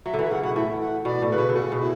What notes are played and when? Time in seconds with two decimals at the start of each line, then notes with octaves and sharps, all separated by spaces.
0.06 F#3 E5
0.14 D3
0.19 E3 E5
0.31 C#3 F#5
0.43 B2 F#5
0.56 A2 E5
0.80 F#5
1.05 B2 D5
1.22 A2
1.31 C#3 B4
1.38 B2
1.49 D3
1.55 C#3 F#4
1.72 B2
1.80 E4